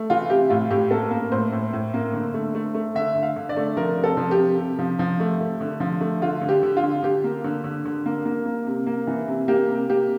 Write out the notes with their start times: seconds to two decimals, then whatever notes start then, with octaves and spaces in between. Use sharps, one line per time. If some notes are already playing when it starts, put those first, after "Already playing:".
Already playing: A3
0.10 E3 F4
0.30 C3 G4
0.50 A2 F4
0.70 A2 G4
0.91 A#3 A4
1.11 A#3
1.32 A2 C5
1.52 A2
1.73 A2
1.94 A#3
2.14 D3
2.34 A3
2.55 A3
2.74 A3
2.95 D3 E5
3.15 D3
3.22 F5
3.36 D3
3.49 D5
3.56 A3
3.77 F3 A#4
3.98 C3
4.04 A4
4.17 F3
4.31 G4
4.38 C3
4.58 C3
4.79 F3
4.99 F3
5.20 A3
5.40 A3
5.61 D3
5.80 F3
6.01 A3
6.22 D3 F4
6.41 D3
6.49 G4
6.63 D3
6.77 F4
6.83 D3
7.03 D3 G4
7.24 A#3
7.44 D3
7.64 D3
7.85 D3
8.06 A#3
8.25 A#3
8.45 A#3
8.67 C3
8.87 A#3
9.07 E3
9.28 C3
9.48 A#3 G4
9.68 C3
9.90 A#3 G4